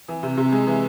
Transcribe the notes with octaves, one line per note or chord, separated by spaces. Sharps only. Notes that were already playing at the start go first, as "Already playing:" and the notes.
E3
C3
C3
G#3
E3